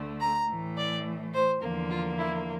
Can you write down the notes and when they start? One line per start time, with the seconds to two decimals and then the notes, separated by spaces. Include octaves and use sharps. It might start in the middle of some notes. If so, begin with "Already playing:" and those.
Already playing: D2 D3 A3
0.21 A#5
0.49 A2 E3 A3
0.77 D5
1.33 C5
1.61 E2 D3 F3 A#3
1.90 F4
2.18 E4